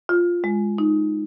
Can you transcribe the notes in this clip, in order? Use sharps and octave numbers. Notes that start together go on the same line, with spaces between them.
F4
G#3
D#4